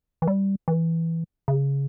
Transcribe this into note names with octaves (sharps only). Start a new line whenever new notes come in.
E3
G3
E3
C#3